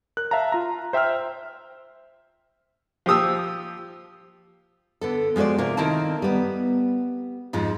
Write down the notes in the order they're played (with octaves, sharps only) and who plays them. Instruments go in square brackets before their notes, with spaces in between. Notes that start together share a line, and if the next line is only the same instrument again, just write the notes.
[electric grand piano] A#4 F#6
E5 F5 A5 A#5
F4 A#5
C5 E5 G5 E6 F6
[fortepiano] F3 G4 D#6 E6
[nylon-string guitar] D3 B3 A4
F3 G#3 F#4 C5 D5
C3 A#3 F4
D#3 A#3 C4 E4 A5
G3 B3
F2 G#2 F3 G#3